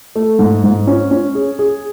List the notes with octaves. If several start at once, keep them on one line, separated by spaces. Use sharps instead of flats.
A3
G#2
G#2
C#4
C#4
G#4
G#4